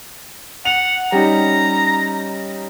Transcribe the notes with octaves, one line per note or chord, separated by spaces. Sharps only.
F#5 F7
G3 C#4 D#4 A#5